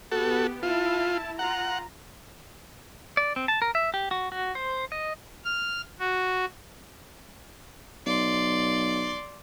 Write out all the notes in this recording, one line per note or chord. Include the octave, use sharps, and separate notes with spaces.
B3 F#4 G4 A4
E4 F4 A5
F4 F#5 A#5
D5
C4
A5
A#4
E5
G4
F#4
F#4
C5
D#5
F6
F#4
B1 D5 C6